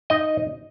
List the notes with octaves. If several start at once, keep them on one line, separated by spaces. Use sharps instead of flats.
D#4 D#5